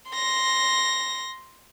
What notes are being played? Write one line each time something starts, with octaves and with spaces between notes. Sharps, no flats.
C6 A#6